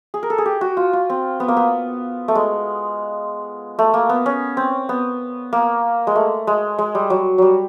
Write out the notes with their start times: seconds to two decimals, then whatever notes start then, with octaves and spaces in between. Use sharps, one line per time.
0.14 G#4
0.23 A#4
0.30 A4
0.38 G#4
0.46 G4
0.61 F#4
0.77 F4
0.93 F4
1.10 C4
1.40 B3
1.48 A#3
1.57 B3
2.28 A3
2.35 G#3
3.79 A3
3.94 A#3
4.09 B3
4.26 C#4
4.57 C4
4.89 B3
5.53 A#3
6.07 G#3
6.16 A3
6.47 G#3
6.78 G#3
6.95 G3
7.10 F#3
7.38 F#3 G3